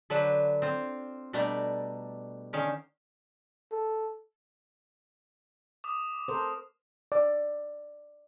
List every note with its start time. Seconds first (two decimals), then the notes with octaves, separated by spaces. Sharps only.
0.10 D3 F#3 D4 B4 C5
0.62 C4 F4
1.33 B2 G3 A3 D4 D5 A#5
2.53 D3 D#3 C#4 F5 G5
3.72 A4
5.84 D6 D#6
6.28 A4 A#4 C5
7.12 D5